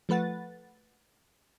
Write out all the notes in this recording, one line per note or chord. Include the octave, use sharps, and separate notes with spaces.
F3 A3 B4 F#5 A6